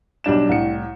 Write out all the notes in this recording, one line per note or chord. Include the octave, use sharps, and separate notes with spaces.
B1 G3 D4 E7
C2 A2 C#7